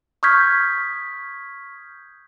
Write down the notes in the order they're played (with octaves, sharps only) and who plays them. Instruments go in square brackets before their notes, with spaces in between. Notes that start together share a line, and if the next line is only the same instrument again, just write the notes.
[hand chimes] C#6 D#6 F6 G6 G#6 B6